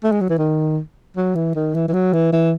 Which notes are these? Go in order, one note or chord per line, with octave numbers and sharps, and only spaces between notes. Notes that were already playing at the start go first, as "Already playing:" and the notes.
A3
G#3
F#3
E3
D#3
F#3
E3
D#3
E3
E3
F#3
E3
E3